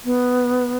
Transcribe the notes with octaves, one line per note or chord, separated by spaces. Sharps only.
B3